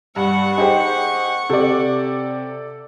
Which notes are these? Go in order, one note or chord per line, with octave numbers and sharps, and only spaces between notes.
G2 F#5 C#6
D#4 G4 G#4 C5
C3 A4 D5